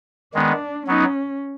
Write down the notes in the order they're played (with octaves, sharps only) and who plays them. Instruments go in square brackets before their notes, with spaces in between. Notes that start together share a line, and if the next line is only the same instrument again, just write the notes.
[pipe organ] D#3 G#3 B3 [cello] D4
[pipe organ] F#3 B3 D#4 [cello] C#4